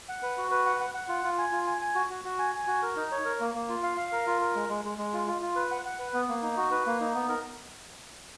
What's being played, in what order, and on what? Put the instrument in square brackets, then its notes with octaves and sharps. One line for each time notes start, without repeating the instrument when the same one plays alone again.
[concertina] F#5
B4
F#4
B4
F#5
F#5
F#5
F4
F4
G#5
F4
G#5
G#5
F#4
F#4
F#4
G#5
G#5
F#4
A#4
D#4
C#5
A#4
A#3
A#3
F4
F5
F5
A#4
F4
A#4
G#3
G#3
G#3
G#3
F4
F4
F4
B4
F#5
F#5
B4
B3
A#3
D#4
F#4
B4
A#3
D#4
B3
A#4